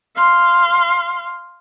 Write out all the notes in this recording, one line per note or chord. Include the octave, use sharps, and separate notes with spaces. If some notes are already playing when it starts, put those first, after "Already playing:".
F5 C6